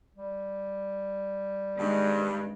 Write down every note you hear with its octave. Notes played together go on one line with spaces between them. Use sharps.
G3
G2 D#3 G#3 C4